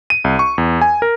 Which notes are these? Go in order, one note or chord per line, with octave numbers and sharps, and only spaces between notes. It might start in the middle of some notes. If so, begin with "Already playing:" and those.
D#7
C2
C#6
E2
G#5
A#4